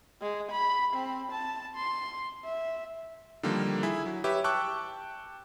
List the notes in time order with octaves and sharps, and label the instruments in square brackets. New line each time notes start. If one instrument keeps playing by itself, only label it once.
[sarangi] G#3
B5
C4
A5
C6
E5
[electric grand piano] D3 D#3 F3 G3 A#3
E4 G#4 E5
F#3
G4 B4 C#5 E5
G5 A5 C#6 D6 E6 F#6